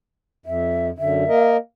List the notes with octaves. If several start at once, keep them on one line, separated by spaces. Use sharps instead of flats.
F2 E5
F#2 D3 E5
A#3 A#4 D#5